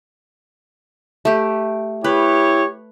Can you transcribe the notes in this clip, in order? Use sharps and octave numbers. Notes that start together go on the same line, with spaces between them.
A3 G4
E4 G4 B4 C#5